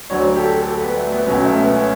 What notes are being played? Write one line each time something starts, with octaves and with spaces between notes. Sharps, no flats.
D2 D3 F#3 C#5
G4
A4
A4
G4
B3
A3
B3
C#2 B2 F#3 C#4
A3
B3
C#4